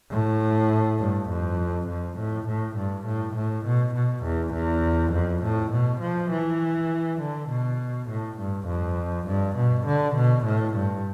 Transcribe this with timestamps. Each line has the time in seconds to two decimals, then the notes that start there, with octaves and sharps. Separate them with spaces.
0.11 A2
0.99 G2
1.29 F2
1.88 F2
2.18 A2
2.48 A2
2.76 G2
3.06 A2
3.36 A2
3.65 B2
3.94 B2
4.24 E2
4.53 E2
5.12 F2
5.43 A2
5.71 B2
6.01 F3
6.31 E3
7.20 D3
7.50 B2
8.09 A2
8.38 G2
8.67 F2
9.26 G2
9.56 B2
9.86 D3
10.15 B2
10.44 A2
10.75 G2